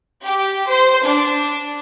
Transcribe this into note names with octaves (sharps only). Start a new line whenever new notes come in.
G4
C5
D4